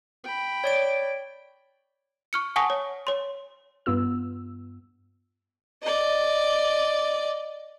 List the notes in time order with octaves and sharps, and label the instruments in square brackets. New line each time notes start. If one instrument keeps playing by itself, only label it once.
[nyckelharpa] G5 B5
[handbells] C#5 D5 D7
[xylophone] C#6 F6 C#7
F#5 G#5 A5 C#6 D#6 A#6
C#5
C#5 C6
[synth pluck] G2 B3 F4 E6
[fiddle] D5 D#5